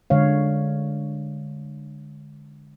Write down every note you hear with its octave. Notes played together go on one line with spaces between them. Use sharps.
D3 G#3 C#5 F5